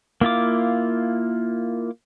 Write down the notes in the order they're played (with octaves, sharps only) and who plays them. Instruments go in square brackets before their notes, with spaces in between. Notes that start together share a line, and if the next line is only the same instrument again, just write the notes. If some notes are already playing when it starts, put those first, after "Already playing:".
[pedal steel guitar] A#3 E4 F4 D6